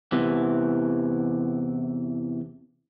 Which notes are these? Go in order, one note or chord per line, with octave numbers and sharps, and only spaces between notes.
E2 C3 E3